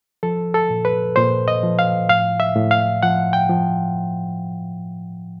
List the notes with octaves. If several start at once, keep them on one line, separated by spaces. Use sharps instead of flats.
F3 A4
A4
A#2
B4
A#2 C5
D#5
F3
F5
A2 F5
E5
A2
F5
F3 F#5
G5
F3